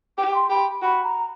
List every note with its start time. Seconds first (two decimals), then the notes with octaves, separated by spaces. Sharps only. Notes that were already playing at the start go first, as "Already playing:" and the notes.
0.18 G4 D6
0.34 C6
0.50 G4 B5
0.82 F#4 B5
1.03 A#5